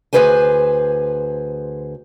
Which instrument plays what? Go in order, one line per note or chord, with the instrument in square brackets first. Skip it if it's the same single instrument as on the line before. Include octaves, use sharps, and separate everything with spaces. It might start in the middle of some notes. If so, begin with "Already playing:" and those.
[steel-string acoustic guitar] D2 D3 G#4 B4 C5 G#5